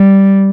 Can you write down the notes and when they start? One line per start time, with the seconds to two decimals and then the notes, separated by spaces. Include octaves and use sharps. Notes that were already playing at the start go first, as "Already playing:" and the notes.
Already playing: G3